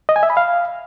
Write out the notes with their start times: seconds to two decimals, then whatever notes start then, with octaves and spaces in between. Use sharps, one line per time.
0.09 D#5
0.16 G#5
0.23 E5
0.30 B5
0.37 F5